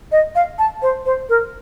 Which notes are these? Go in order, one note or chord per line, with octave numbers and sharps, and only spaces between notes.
D#5
F5
A5
C5
C5
A#4